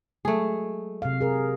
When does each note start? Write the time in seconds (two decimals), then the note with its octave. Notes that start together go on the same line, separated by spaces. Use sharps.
0.25 F#3 G#3 A3 G#4
1.02 C3 F5
1.21 G#4 A#4